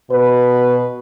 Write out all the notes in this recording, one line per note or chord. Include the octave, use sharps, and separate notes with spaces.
B2 B4